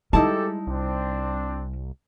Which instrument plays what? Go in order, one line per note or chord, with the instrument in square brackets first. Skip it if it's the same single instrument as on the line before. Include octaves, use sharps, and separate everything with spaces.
[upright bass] G3 [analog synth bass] G#3 [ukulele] D#4 E4 A5 [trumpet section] G4 A4
[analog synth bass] C2 [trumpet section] C4 D4